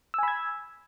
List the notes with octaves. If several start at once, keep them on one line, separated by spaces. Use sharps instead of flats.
G#5 B5 E6 G#6